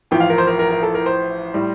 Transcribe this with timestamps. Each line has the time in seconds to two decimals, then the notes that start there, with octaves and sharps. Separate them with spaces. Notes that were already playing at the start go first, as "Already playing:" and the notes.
0.11 A1 A2 F3 G5
0.20 F5
0.30 A#4
0.38 C5
0.47 A#4
0.59 A#4
0.70 A#4
0.83 A4
0.95 A#4
1.06 C5
1.54 A2 G3